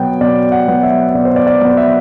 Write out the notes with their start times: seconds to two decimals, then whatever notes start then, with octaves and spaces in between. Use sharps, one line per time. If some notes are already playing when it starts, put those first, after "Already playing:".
Already playing: B2 F#3 B3 G5
0.21 B2 D5
0.52 F#5
0.68 F#3 B3
0.83 E5
1.15 B2 D5
1.25 C5
1.36 D5
1.47 D5
1.61 F#3 B3
1.77 E5